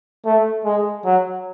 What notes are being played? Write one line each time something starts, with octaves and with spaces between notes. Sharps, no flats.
A3
G#3
F#3